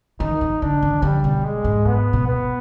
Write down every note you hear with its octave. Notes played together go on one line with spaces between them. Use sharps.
D#3 D#4
D#3
D3 D4
D#3
D3 G3
B2
G#3
G#2
G#2 B3
B2
B3